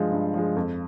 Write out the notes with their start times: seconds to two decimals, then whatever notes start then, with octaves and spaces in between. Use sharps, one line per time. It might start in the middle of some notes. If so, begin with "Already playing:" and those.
Already playing: G2 F3 G#3
0.12 G2
0.34 F3 G#3
0.56 F2